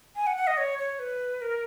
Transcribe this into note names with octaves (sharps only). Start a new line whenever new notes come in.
G#5
F#5
F#5
D#5
C#5
C#5
B4
A#4